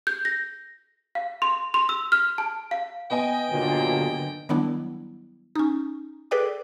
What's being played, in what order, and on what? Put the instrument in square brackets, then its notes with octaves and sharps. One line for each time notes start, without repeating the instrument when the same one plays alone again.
[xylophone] G6
A#6
F5
C6
C6
E6
F6
A5
F5
[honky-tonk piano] B3 D#5 G#5 [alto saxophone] G5
[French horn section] G2 A#2 F#3 [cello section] D3
[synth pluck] D#3 F#3 G3 B3 D4 E4
C#4 D#4
G#4 A4 B4 D5 G5 D6